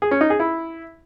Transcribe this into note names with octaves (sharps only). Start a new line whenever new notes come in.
G#4
C#4
D#4
G#4
E4